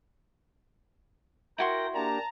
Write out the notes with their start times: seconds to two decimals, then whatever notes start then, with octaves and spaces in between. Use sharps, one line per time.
1.58 E4 F#4 A#4 G5 C6 A#6
1.95 A#3 D4 G4 A5 A#5